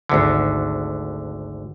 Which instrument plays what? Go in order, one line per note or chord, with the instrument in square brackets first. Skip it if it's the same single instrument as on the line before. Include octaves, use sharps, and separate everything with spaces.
[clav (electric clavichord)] G#1 D2 D3